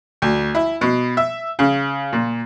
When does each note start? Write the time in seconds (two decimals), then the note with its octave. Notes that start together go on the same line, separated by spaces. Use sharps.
0.22 D2
0.55 E4
0.81 B2
1.17 E5
1.59 C#3
2.13 A#2